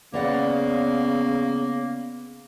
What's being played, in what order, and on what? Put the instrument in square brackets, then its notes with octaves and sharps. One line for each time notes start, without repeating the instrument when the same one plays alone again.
[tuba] C#3 [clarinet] A#3 [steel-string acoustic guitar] B3 D5 F#5